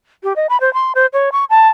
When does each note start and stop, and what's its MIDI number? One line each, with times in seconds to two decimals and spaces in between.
0.23 0.33 67
0.36 0.47 75
0.49 0.60 83
0.61 0.72 72
0.74 0.92 84
0.95 1.06 72
1.13 1.29 73
1.32 1.45 85
1.50 1.68 81